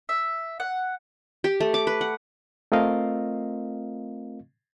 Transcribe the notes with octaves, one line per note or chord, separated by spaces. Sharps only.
E5
F#5
G4
A3
D6
B4
F#5
A3 C4 F4 A#4 D#5 F5